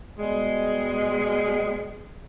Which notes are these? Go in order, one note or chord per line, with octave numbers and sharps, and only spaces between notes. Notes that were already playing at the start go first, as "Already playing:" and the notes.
B2 G3 G#3